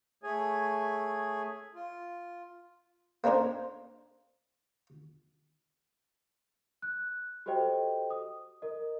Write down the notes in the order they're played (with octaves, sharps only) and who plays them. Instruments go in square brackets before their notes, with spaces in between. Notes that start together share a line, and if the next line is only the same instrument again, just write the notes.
[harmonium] A3 G#4 C#5 G#5
F4
[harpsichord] A#3 C4 D4 A#4 C5
[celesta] F#6
F#4 G4 A4 C5 D#5 G5
D#6
A#4 D#5